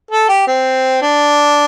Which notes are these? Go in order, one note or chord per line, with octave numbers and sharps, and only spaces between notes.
A4
G4
C4
D4